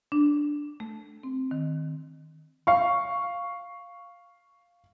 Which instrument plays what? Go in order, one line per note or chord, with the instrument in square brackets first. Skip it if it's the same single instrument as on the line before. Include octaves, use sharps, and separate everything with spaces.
[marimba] D4
A3
C4
D#3
[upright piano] F5 C#6